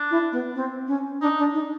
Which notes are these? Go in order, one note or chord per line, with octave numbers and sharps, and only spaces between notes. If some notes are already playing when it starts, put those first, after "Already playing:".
Already playing: D4
E4
B3
C4
C#4
D4 D#4
D4
D#4